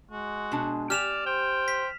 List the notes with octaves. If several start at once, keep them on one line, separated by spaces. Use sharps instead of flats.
G#3 F#4
B2 D4
G4 D5 G#5 F6 E7 F7
C5 G5
B6